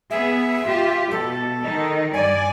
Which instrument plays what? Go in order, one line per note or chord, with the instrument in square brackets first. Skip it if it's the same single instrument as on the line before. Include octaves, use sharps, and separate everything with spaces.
[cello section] B3 G#4 [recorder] E5
[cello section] F4 G4
[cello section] B2 [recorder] A4
[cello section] D#3 D#4
[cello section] G2 D5 [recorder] G#5